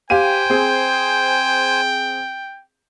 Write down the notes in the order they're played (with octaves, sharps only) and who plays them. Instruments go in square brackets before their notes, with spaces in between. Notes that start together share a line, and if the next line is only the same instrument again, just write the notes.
[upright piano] G4 F5 D#7 [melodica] C5 G#5 [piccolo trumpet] G5
[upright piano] C4 G#4